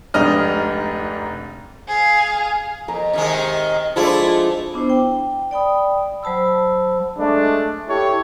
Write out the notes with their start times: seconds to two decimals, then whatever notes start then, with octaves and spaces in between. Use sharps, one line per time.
0.14 F1 G#2 D4 D#5 F6
1.88 G#4 F5
2.88 F2 A#4
3.13 C3 D#3 G#3
3.96 F3 G#3 A3 D4 E4 F4
4.74 B3 D4 E4 C5
4.89 G5
5.51 D5 G5 B5 D#6
6.23 F#3 C5 A5 B5 E6
7.18 G#3 A3 D4
7.89 E4 G4 A4 C#5